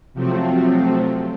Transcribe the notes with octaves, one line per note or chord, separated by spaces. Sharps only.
C3 F3 F#3 A3 C4